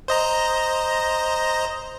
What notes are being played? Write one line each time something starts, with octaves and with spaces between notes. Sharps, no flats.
C5 D#5 A#5